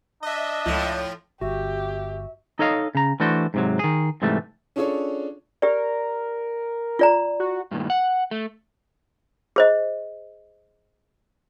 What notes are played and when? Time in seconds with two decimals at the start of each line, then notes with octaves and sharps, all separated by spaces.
0.23 D4 D#5 E5
0.66 C#2 A2 F3
1.41 G1 F#4 G4 E5
2.59 D#4 A4 C#5 D#5 F5
2.95 C#3 A#5
3.20 E3 A3 D4 F#4 C5
3.54 G#2 C3 F#3
3.79 D#3 G#4
4.22 G#2 C3 E3 G3 A3
4.76 C#4 D4 F4 G#4 A4 C#5
5.62 G4 A#4 D5
6.99 F4 D5 A#5
7.40 F#4
7.71 G2 A#2 D#3
7.90 F#5
8.31 A3
9.56 G#4 C5 D#5